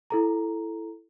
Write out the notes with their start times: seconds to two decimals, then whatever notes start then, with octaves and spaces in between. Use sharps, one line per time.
0.10 E4 A4 A#5